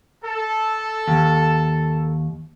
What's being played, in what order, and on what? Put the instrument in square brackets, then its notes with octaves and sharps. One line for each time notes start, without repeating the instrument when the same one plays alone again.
[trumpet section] A4
[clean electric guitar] D#2